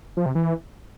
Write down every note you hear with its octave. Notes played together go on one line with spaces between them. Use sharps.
F3
C3
E3